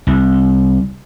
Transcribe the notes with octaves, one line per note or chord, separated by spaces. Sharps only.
C2